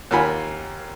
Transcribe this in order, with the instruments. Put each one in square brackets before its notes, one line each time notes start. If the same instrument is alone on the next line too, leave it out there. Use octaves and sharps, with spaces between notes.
[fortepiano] D#2 A#3 F4 F#5 G#5 B5